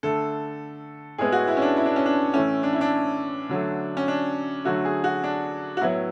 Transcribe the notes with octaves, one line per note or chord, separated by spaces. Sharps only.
D3 A3 A4
A2 G#3 B3 G#4
F#4
E4
C#4
D4
E4
D4
C#4
D4
A2 E3 A3 C#4
D4
E4
D4
D3 F#3 A3
C#4
D4
D3 F#3 A3 F#4
G#4
F#4
D4
F#4
A2 F#3 B3 E4